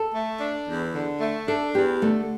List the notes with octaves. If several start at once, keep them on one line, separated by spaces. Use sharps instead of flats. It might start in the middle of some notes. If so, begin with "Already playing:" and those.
Already playing: A4
A3
D4
E2
D3
A3
D4 A4
E2 G4
D3 A3